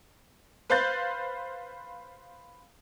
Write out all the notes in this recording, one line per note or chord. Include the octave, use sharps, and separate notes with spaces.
B4 C5 F5 F#6 G6 A6